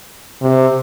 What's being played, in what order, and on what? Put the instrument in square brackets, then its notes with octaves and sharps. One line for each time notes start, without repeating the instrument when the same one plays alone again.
[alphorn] C3